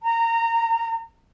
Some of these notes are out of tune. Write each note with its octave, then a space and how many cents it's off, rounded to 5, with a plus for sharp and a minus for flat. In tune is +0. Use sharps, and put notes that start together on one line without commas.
A#5 -20